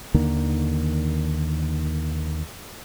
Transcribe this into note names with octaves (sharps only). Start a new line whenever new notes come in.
D#2 D3 D#3 A#3